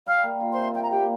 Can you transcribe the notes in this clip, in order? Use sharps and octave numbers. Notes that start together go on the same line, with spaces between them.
G3 F5 F6
A#3
F4
C5 C6
C3
G3 G5
A#5
A#3 G4 G5